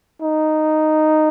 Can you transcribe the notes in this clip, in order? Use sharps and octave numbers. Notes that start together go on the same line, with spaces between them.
D#4